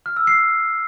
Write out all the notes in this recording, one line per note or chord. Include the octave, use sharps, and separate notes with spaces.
F6
E6
C7